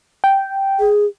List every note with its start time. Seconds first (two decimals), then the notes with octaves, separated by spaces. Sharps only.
0.24 G5
0.79 G#4